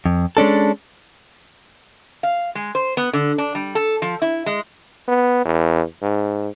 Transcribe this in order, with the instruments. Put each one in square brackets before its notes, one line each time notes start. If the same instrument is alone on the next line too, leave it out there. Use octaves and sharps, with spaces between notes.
[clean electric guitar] F2
G#3 C#4 D4 A4
[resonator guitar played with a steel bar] F5
G#3
C5
B3
D3
D4
G3
A4
F3
E4
G#3
[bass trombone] B3
E2
G#2